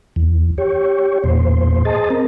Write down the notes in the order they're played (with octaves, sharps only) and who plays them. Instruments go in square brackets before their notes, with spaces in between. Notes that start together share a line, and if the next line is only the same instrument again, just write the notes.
[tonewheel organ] E2
G4 C#5
E2 A#2 C5
G#4 C5 D#5 A5
C4 A#4